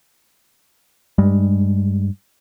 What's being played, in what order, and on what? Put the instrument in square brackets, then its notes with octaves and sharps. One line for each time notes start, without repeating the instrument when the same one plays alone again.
[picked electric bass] G2 G3 G#3